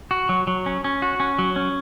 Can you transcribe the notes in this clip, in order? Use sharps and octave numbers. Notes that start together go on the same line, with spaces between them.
F#4
F#3
F#3
C#4
C#4
F#4
C#4
F#3
C#4